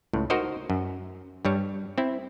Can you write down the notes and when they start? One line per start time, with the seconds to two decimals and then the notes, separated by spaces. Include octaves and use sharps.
0.13 C#2 A2
0.30 D#4 F#4 A#4 C5 D#5
0.70 F#2
1.45 G2 G3 C#5
1.98 C4 E4